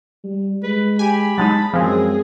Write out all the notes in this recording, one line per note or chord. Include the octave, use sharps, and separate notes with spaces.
G3
G#3 B4
G4 G#5 B5
F#3 G#3 D#4 A5
F#2 F3 G#3 C4 G#4